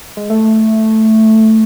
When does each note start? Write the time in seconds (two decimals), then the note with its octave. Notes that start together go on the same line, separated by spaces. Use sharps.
0.17 G#3
0.30 A3